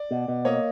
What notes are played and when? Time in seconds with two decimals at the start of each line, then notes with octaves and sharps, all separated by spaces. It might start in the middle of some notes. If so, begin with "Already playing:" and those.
Already playing: D5
0.11 B2
0.28 B2
0.45 A#3 C#5 D#5